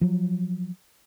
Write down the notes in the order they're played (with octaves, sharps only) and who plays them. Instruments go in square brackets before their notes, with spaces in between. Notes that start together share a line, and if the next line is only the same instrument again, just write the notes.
[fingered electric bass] F3 F#3